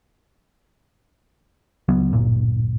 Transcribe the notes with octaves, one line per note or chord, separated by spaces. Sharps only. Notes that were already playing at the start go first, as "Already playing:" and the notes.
C#2 F#3 B3
D1 G1 A#2